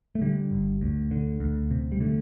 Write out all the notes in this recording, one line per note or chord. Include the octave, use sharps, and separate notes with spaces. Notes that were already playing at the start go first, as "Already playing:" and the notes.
A3
D3 G3
G1
D2
D3
D2
C3
G3
D3 A3